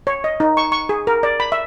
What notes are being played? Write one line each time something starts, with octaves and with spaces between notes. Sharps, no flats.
C#5
D#5
D#4
C#6
C#6
G#4
A#4
D5
B5
E5